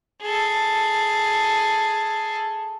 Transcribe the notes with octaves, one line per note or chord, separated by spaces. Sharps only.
G#4 A4